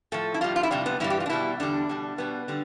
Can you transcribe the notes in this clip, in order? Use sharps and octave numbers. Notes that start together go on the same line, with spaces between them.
A2 F3 A4
E4
A2 G3 F4
F4
E4
F2 C3 G3 D4
B3
G2 E3 G3 E4
G4
F4
D4
B2 G3 E4
E2 D3 G3 D4
B2 G3
B2 G3 B3
D3 G3